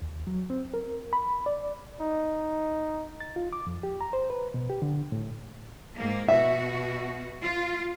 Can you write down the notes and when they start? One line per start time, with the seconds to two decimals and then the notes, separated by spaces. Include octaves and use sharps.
0.02 D#2
0.27 F#3
0.50 C4
0.74 A#4
1.13 B5
1.46 D5
2.01 D#4
3.20 A6
3.36 F4
3.53 D6
3.67 F2
3.83 G4
4.01 A#5
4.13 C5
4.30 B4
4.54 B2
4.70 G4
4.82 D3
5.12 A2
5.97 G#2 A#3
6.28 B2 F#4 E5
7.42 F4